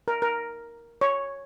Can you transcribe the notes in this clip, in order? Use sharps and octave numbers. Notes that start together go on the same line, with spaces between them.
A#4
A#4
C#5